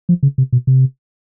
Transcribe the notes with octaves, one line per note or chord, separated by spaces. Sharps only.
F3
C#3
C3
B2
C3